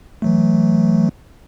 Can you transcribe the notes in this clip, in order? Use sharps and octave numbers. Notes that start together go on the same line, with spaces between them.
E3 F#3 A3